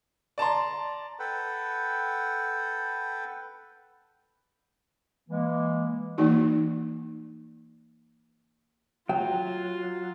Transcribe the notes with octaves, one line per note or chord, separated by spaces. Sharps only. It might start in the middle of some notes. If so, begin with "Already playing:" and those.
D5 A5 A#5 C6
A4 B4 F#5 G5
E3 G#3 A#3
E3 A#3 D#4 F#4
F#3 F4 G5